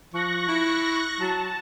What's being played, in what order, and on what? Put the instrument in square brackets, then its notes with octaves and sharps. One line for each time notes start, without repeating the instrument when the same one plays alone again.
[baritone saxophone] F3 [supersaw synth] C#6 F#6 A#6
[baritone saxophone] E4
[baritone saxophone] F#3 [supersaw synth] A5